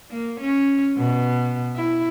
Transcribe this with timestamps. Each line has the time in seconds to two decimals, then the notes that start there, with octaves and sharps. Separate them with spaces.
0.10 A#3
0.40 C#4
0.97 B2
1.76 E4